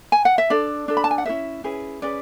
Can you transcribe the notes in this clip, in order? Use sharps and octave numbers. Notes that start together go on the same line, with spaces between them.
G#5
F#5
E5
D4 A4 D5
D4 A4
B5
A5
G#5
F#5
C#4 E4 G#4 B4 E5
C#4 E4 G#4 B4
C#4 G#4 B4 D5